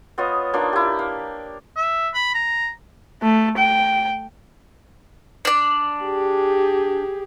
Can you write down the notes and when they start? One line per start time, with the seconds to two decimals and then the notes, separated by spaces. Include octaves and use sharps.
0.18 B3 F4 C#5 D#5
0.53 A#3 D4 D#4 F4
0.73 E4 G4
0.99 F5
1.76 E5
2.14 B5
2.34 A#5
3.22 A3
3.58 G5
5.45 D4 D5
6.03 G4 G#4